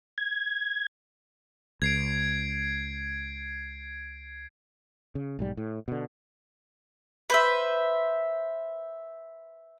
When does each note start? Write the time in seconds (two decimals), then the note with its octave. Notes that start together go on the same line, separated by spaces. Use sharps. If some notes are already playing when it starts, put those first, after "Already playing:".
0.18 G#6
1.82 C#2 G#6 C7 D7
5.15 C#3
5.39 B1 G#2 G3
5.57 A2
5.88 B2 D3
7.30 B4 C5 E5